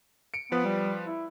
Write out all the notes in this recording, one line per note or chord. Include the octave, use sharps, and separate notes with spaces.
C#7 D7
F3 B3 B4
G3
E4